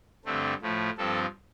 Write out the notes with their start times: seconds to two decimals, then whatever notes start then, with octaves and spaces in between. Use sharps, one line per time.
0.25 G2 D3 A3 C4
0.62 A2 F3 A3
0.97 G2 F3 C4 A4